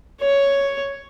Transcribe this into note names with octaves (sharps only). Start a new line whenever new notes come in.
C#5